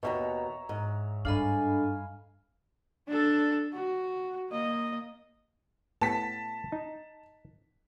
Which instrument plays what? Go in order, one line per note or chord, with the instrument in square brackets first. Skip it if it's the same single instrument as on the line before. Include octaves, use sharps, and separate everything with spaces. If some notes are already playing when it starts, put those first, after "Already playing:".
[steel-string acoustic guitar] D#2 G#2 B2 [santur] C#5 E5 A#5
[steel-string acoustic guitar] G#2
[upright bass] G2 [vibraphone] D4 A4 D#5 [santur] F5 G#5 B5
[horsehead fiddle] D4 A4
F#4
A#3 D#5
[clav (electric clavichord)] A2 B3 G5 [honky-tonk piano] A5 B6
[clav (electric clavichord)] D#4